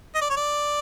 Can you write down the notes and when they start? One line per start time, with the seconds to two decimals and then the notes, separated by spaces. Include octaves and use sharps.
0.15 D#5
0.22 D5
0.30 C#5
0.37 D5